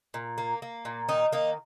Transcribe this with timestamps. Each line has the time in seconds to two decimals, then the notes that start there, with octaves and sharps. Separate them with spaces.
0.14 A#2
0.38 A#3
0.62 A#3
0.85 A#2
1.09 D#3 D#4
1.32 A#3 D#4